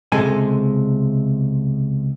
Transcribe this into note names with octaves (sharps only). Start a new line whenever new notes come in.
C#2 C3 G#3 A4 G#5